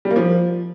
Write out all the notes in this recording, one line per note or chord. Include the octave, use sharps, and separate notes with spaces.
G3
A#3
F3